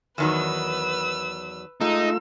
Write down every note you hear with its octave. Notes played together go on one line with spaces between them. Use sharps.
E2 D#3 F#3 B4 E6
G#3 A3 D#4 F4 E6